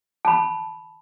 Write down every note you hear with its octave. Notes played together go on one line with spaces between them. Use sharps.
A5 B5